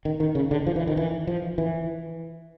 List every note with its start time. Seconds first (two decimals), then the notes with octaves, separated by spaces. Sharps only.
0.05 D#3
0.20 D#3
0.35 C#3
0.51 D3
0.66 F3
0.76 E3
0.87 D#3
0.97 E3
1.27 F3
1.58 E3